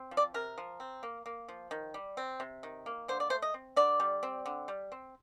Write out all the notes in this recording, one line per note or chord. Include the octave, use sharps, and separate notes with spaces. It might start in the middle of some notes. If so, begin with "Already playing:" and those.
Already playing: C4
F3
D5
C3 A#4
F3
C4
A#3
A#3
F3
D#3
G3
C4
C3
D#3
A#3
D3 C5
D5
A3 C5
D#5
C4
D3 D5
G3
C4
D3
G3
C4